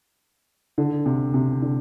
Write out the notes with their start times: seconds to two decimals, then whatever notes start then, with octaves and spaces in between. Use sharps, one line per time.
0.78 D3
1.06 C3
1.34 C3
1.62 D3